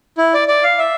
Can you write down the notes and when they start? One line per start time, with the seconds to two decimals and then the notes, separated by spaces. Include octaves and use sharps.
0.18 E4
0.34 D5
0.48 D5
0.64 F5
0.79 E5